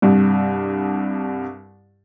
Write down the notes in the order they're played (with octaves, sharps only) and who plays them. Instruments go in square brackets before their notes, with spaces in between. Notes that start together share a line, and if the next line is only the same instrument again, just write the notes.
[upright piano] C2 G2